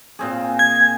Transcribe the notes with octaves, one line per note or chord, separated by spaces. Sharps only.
A#2 C4 G#4
G#6